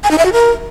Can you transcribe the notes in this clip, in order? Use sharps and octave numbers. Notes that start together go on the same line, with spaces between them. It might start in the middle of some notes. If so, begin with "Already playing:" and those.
G#5
D#4
E5
F#4
A#4